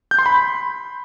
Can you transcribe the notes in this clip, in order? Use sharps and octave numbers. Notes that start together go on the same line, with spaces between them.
G6
C6
B5